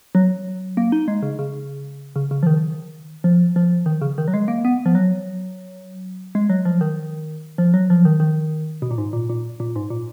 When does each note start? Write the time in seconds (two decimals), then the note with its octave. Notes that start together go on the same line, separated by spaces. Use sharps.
0.15 F#3
0.77 A#3
0.92 D#4
1.08 G#3
1.23 C#3
1.39 C#3
2.16 C#3
2.31 C#3
2.43 F3
2.47 D#3
3.24 F3
3.56 F3
3.86 D#3
4.01 C#3
4.18 D#3
4.28 F#3
4.34 G#3
4.48 A#3
4.65 B3
4.86 F3
4.95 F#3
6.35 G#3
6.50 F#3
6.65 F3
6.81 D#3
7.58 F3
7.74 F#3
7.90 F3
8.05 D#3
8.20 D#3
8.82 B2
8.91 A#2
8.98 G#2
9.13 A#2
9.29 A#2
9.60 A#2
9.76 G#2
9.90 A#2